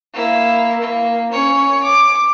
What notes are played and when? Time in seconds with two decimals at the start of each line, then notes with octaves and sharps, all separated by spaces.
0.13 A#3 E4
0.81 A#3
1.32 C#4 C#5
1.83 D6